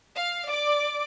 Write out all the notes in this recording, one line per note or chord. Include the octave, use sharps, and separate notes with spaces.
F5
D5 D6